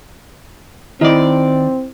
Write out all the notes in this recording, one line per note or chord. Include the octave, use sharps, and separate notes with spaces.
D#3 C4 E4 D5 D#5